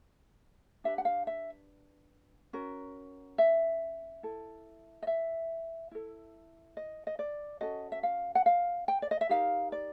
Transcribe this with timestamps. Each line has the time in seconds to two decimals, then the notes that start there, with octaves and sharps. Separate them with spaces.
0.84 D4 G4 B4 E5
0.98 F#5
1.05 F5
1.27 E5
2.53 C#4 F#4 A#4
3.38 E5
4.23 E4 A4
5.02 D#5
5.07 E5
5.91 E4 A4
6.77 D#5
7.07 D#5
7.19 D5
7.61 C#4 F#4 A4 D#5
7.92 E5
8.03 F5
8.35 F#5
8.46 F5
8.88 G5
9.02 D5
9.11 D#5
9.21 E5
9.29 D#4 G4 A#4 F5
9.72 D5